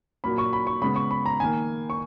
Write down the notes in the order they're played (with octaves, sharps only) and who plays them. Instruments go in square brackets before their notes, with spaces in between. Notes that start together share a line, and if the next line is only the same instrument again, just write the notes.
[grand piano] A#2 F#3 A#3 B5
C#6
B5
C#6
C#3 G#3 B3 B5
C#6
B5
A#5
D#3 A#3 G#5
C#6